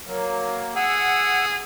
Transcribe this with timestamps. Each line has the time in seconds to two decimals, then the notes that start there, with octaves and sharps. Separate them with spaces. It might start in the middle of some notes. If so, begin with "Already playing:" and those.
0.07 F#3 A#3
0.76 G#4 F#5 E6